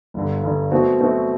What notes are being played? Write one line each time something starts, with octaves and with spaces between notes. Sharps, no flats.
G1 G2 D3
G1 G2 D3
B2 F#3 A3 C4 F#4
B2 F#3 A3 C4 F#4